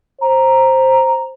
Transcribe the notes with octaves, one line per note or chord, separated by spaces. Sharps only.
C5 A#5